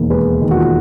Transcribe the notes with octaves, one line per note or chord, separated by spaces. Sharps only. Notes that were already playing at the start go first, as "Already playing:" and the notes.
Already playing: E1 D#2 D#3
G#3 B4
D#3
F#4
F4